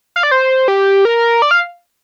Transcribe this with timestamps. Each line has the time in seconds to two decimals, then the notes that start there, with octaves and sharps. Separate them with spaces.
0.16 F5
0.23 D5
0.31 C5
0.68 G4
1.05 A#4
1.42 D5
1.51 F5